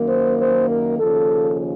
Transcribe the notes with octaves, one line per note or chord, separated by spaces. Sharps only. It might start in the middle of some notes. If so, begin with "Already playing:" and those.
Already playing: F#2 D#3 A#3
C5
C5
A#4
D#2 C#3 F3 A4